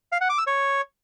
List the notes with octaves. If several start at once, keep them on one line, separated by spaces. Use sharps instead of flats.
F5
F#5
D6
E6
C#5